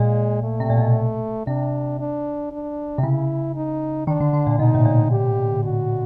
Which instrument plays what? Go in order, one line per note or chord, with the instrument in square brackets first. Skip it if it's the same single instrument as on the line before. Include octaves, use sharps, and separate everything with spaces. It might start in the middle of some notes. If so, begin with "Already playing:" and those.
Already playing: [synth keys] A#2 [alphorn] G#3
[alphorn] A3
[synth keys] C3
A#2
B2
[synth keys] C3 [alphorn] D4
[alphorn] D4
D4
[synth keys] C3
[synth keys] C#3 [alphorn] E4
[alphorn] D#4
[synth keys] D#3 [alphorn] D4
[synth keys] D3
D3
A#2
[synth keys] B2 [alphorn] D#4
[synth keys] A2
A#2
[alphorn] G4
F#4